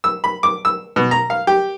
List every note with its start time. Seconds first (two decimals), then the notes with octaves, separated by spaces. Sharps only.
0.04 E6
0.24 B5
0.43 D6
0.65 E6
0.96 B2
1.11 A#5
1.30 F5
1.47 G4